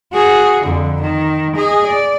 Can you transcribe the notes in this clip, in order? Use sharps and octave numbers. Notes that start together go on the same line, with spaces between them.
F#4 G#4
F2 D3
D#3
G#4 D#5
D5